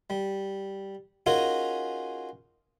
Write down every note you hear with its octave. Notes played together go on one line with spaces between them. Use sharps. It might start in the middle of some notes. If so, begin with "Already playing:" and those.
G3
C#4 D#4 F4 F#4 G#4 A#4